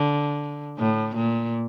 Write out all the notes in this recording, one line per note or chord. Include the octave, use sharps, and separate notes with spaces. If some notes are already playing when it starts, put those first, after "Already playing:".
Already playing: D3
A2
A#2